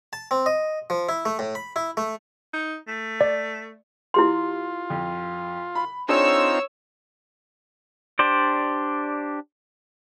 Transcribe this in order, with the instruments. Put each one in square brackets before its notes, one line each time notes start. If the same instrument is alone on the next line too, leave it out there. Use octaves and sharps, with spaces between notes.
[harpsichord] A5
C4
D#5
F3
E4
A3
A2
B5
E4
A3
[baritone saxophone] D#4
A3
[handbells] D5
[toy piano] E4 G4 C6 [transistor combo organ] F4
[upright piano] F2
B5
[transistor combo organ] C4 D#4 F4 [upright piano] D4 G#4 [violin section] C#5 E6
[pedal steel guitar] D4 G4 C5 D5